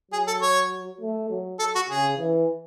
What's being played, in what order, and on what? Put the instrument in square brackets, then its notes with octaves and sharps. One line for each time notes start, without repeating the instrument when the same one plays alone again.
[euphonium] F#3 [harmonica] G#4
[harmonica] A4
C#5
[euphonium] A3
F#3
[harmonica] A4
F#4
[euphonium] C#3 [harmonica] G#4
[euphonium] E3